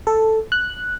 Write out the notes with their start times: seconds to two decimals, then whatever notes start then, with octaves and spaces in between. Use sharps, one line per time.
0.07 A4
0.52 F#6